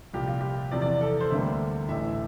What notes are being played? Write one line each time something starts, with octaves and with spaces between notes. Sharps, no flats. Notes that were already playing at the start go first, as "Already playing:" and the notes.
C2 A#2 F3 G4
F4
G4
E2 C3 F3 D5
D5
A4
C5
D2 D3 G3 A#3 E5
A1 A2 E3 E5